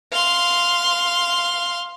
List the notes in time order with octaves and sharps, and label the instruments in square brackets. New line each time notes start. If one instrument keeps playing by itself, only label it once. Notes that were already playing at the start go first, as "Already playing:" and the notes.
[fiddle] F5 C6